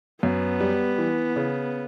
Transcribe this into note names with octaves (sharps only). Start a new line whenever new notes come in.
F#2 B3
G3
E3
C#3